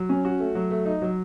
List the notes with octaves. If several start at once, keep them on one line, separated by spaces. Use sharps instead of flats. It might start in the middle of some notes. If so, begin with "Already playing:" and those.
Already playing: F#3
C#4
F#4
A3
F#3
A3
D#4
F#3